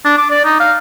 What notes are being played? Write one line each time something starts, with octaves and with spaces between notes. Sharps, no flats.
D4
D6
D5
D#4
F5